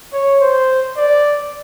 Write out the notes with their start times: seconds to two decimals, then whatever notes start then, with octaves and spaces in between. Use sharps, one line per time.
0.13 C#5
0.41 C5
0.97 D5